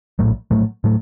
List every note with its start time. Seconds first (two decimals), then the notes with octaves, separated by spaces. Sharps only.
0.19 A#1 A2 F#3 A3
0.51 A#1 A2 F#3 A3
0.84 A2 F#3 A3